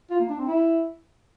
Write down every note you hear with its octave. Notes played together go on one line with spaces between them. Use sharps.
F4
A#3
D4
C4
E4